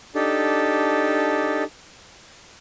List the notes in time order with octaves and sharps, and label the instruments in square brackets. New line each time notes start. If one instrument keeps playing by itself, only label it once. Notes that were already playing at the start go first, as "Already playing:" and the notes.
[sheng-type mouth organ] D4 D#4 G4 A4